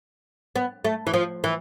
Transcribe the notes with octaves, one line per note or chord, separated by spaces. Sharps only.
B3
A3
E3
F3
E3